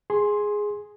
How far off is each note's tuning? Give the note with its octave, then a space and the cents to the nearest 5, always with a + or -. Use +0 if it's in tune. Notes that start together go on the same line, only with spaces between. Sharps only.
G#4 +0 C6 +10